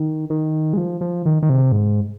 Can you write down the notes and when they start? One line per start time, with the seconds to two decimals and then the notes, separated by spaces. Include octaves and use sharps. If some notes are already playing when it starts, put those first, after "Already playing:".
Already playing: D#3
0.30 D#3
0.73 G#3
0.77 F3
1.01 F3
1.26 D#3
1.43 D#3
1.50 C3
1.72 G#2